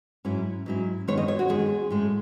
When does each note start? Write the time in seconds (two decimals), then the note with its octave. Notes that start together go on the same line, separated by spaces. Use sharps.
0.25 G#2 F#3 C#4 E4
0.66 G#2 F#3 C#4 E4
1.08 E2 D#3 G#3 C#4 C#5
1.18 D#5
1.28 C#5
1.39 F#4
1.48 E2 D#3 G#3 C#4 G#4
1.91 A2 G#3 C#4